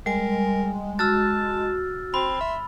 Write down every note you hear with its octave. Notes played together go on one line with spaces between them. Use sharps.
G3 G#3 A#4 G#5
F#4 A5 E6 F6 A6
C4 B5 C6
E5